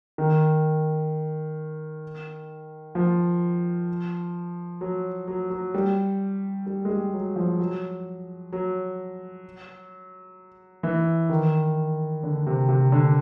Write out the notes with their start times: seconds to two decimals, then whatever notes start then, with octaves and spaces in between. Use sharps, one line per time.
0.18 D#3
2.95 F3
4.81 F#3
5.28 F#3
5.50 F#3
5.74 G3
6.66 G3
6.85 G#3
6.90 G3
7.13 F#3
7.36 F3
7.59 F#3
8.53 F#3
10.83 E3
11.30 D#3
12.23 D3
12.47 C3
12.69 C3
12.92 D3